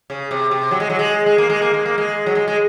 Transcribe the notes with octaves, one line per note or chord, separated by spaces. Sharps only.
C#3
C3
C3
F#3
G#3
F#3
G#3
G#3
A#3
G#3
A#3
G#3
A#3
G#3
F#3
G#3
G#3